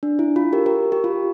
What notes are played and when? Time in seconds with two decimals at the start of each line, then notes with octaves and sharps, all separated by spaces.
0.03 D4
0.19 E4
0.36 F4
0.53 G4 A#4
0.66 G4 A#4
0.92 G4
1.04 F4